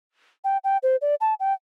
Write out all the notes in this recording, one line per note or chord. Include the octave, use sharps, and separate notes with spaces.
G5
G5
C5
D5
A5
G5